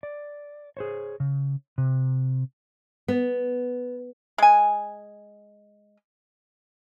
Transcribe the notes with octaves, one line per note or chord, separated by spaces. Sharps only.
D5
G#4 C5 C#5
C#3
C3
B3
G#3 G#5